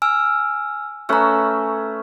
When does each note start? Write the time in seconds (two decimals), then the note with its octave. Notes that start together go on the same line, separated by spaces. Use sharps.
0.02 G#5 E6 F6
1.09 A3 C#4 B4 A#5 E6